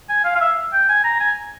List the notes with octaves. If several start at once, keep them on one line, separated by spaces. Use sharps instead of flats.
G#5
F5
F5
E5
G5
G#5
A#5
G#5